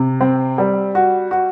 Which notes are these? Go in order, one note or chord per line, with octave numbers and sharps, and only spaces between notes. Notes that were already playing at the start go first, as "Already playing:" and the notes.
Already playing: C3
C4
G3
F#4
F#4